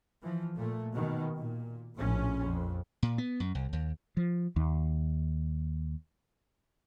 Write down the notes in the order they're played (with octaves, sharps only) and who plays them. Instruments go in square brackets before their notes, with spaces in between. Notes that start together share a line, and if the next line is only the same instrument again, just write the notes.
[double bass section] E3 F3
A#2 A3
B2 D#3
A#2
A#1 A2 C#4
F2
[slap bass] A#2
B3
F#2
C2
D#2
[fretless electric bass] F3
D#2